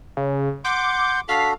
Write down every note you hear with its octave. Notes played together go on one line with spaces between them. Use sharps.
C#3
F#5 C6 D6 G6
D4 F#4 A4 F5 B6